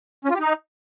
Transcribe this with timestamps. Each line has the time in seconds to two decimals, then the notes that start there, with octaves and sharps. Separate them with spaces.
0.25 C#4
0.30 F4
0.35 G4
0.40 D#4